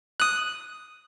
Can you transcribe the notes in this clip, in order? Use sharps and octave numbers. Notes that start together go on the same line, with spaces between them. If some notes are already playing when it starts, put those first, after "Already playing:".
D#6 F#6